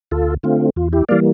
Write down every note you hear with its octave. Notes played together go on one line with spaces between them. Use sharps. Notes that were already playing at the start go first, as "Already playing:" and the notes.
D2 F4 A4
D3 A3 C4 F4
E2 F4
E4 G4
E3 G3 A#3 D5 F5